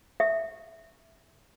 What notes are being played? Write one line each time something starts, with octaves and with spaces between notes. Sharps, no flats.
E5